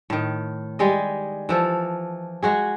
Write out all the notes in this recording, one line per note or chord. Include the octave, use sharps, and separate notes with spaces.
A2 D#3
G3 G#3 D#5
E3 F3 A4
G#3 F#4 G#4